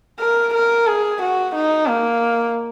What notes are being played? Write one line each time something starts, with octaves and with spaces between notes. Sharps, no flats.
A#4
A#4
G#4
F#4
D#4
A#3